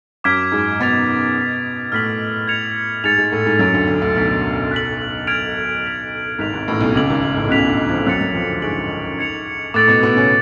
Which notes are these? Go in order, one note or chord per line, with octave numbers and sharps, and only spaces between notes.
F#2 F#3 D6 F6 G#6 B6 D7
G#2 G#3
B2 B3 F6 A6 F7
D6 F6 B6
A2 A3 F6 B6 F#7
G#6 C#7 F7
G#2 G#3 F6 A6 C#7 F7
G#2 G#3
A2 A3
G#2 G#3
F#2 F#3 D6 G#6 D7
D2 D3
D2 D3
D2 D3
B1 B2 F6 B6 D7
F#6 B6 F#7
F6 G#6 D7 F7
F#6 B6 F7
G#1 G#2 F#6 B6 F7
G#1 G#2
A1 A2
B1 B2
C#2 C#3 D6 G#6 D7 F#7
G#1 G#2
G#1 G#2
A1 A2
B2
C#2 C#3 F#6 B6 F7
D2 D3
F2 F3
F#2 F#3 F#6 A6 C#7
F#2 F#3
F2 F3
D2 D3
G#2 G#3 C#6 F#6 B6 D7 F#7
G#6 C#7 F7
A2 A3 D6 F#6 A6 D7 F#7
B2 B3
B2 B3
C#3 C#4